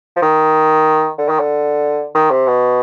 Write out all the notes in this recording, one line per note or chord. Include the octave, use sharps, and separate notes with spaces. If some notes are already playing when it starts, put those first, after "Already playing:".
F3
D#3
D3
D#3
D3
D#3
C3
B2